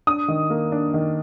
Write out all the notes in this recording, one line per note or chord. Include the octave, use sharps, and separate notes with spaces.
D4 D#6
D#3
A#3
D4
D#3